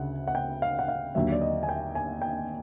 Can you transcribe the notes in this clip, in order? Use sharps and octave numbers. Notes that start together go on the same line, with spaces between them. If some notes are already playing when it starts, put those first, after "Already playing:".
Already playing: D2 C#3 F#5
F#5
G5
F5
F#5
F5
D#2 D3 F#3 E5
D5
D#5
G#5
G5
G#5
G5